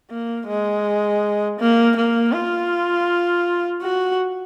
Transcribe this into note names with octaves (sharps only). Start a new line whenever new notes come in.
A#3
G#3
A#3
A#3
F4
F#4